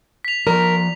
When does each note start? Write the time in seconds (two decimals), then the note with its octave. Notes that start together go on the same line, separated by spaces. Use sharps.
0.25 B6 F7
0.47 F3 A#4 D5 A#5